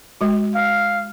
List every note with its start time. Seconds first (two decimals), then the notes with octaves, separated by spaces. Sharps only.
0.21 G#3 F#4
0.55 F5